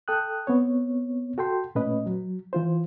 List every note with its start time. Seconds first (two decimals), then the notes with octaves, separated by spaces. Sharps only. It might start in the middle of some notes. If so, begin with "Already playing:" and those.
0.08 A4 G5 D#6 F#6
0.47 B3 C4 C#5
1.38 F#4 A4 G5 C6
1.75 A#2 A3 C#4 B4 D#5
2.06 F#3
2.53 E3 F4 C5